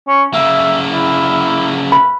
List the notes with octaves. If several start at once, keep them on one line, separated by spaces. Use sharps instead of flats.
C#4
C#3 A#3 E5
E4
B5